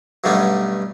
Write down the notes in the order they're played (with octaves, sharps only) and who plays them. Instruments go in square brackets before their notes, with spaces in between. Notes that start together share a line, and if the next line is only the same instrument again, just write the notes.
[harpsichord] G2 B2 F#3 G3 A3 C#4